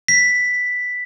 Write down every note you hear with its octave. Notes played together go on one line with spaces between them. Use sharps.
B6